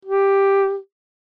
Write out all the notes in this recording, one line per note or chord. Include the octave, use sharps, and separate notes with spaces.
G4